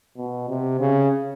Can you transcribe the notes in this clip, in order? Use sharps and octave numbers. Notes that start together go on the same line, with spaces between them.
B2
C3
C#3